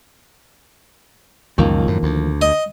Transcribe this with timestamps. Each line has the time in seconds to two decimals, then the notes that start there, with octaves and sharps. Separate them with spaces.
1.58 C#2 F#2 D#3 F3 A#3
1.87 F#2 A2
2.03 D2
2.42 D#5